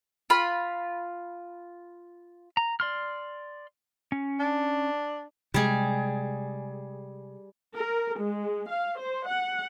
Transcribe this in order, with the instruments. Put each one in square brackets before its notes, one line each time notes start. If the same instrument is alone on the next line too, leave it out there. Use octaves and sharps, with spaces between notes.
[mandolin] F4 B5
[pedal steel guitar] A#5
D5 C6 F6
C#4
[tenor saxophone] D4
[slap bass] C3 G#3 [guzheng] G3 G#4
[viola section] A#4
G#3
F5
C5
F#5